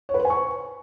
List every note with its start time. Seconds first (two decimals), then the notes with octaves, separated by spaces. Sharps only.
0.09 C#5
0.14 B4
0.20 C5
0.25 G#5
0.30 C#6